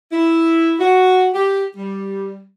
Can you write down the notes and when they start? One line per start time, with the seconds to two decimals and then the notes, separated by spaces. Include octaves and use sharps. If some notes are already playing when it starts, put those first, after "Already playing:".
0.12 E4
0.80 F#4
1.34 G4
1.76 G3